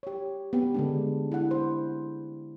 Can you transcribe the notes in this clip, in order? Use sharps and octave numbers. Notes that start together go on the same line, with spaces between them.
G4 C#5
B3 G4
D3 G#3 D4
E4 F#5
C5